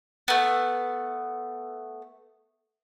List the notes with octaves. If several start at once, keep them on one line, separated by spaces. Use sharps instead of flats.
A3 B3